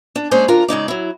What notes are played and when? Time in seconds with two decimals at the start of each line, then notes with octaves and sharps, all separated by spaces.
0.16 D4
0.31 G#3 A#3 C#4 A4 C5 D5
0.48 D2 D4 F4 A#4 A#5
0.68 C#3 G#3 D#4 D5
0.88 F#3 E4